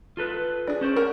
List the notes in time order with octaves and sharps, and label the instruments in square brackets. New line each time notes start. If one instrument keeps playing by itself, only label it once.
[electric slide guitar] F4 A4 B4
[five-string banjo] D4 G#4
[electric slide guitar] C#4 C5 D5
[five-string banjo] A#4 F#5